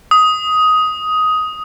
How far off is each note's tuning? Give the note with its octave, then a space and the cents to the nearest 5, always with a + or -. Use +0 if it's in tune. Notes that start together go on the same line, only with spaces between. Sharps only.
D#6 +10